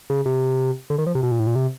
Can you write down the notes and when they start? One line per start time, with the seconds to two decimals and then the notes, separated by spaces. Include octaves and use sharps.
0.10 C#3
0.26 C3
0.90 D3
0.98 D#3
1.07 F3
1.15 C3
1.23 B2
1.31 A#2
1.40 A2
1.47 A#2
1.55 C3